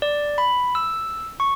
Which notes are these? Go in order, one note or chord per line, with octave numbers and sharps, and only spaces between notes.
D5
B5
E6
C#6